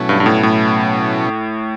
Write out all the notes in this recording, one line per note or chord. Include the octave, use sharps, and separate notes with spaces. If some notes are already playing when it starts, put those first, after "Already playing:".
Already playing: B2 F#3 A3 C#4 E4
G2
G2
A2
A2